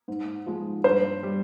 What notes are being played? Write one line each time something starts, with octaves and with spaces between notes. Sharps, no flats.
G#2
F3 G#3
G2 C5
G3